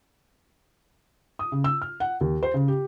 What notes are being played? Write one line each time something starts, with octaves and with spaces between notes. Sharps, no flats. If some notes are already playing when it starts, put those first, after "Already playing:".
D#6
C#3
E6
F6
F#5
D#2
C5
C#3
G4